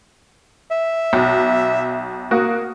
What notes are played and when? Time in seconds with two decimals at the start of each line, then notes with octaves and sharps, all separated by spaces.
0.71 E5
1.13 B1
2.31 A#3 F#4 D#6